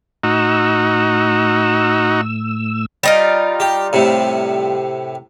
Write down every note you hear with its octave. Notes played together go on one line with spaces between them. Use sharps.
A2 D#4 F#4 E6
G3 D#4 F4
G4
A2 C3